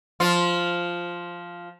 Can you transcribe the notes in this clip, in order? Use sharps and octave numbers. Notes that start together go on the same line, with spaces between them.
F3 F4